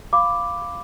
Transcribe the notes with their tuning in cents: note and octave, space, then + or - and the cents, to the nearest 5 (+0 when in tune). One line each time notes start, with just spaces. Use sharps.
F5 +0 B5 +15 D6 +0